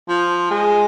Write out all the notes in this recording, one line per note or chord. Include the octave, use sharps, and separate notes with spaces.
F3
G#3